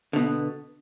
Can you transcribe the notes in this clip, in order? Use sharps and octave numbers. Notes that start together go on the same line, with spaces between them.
B2 D3 B3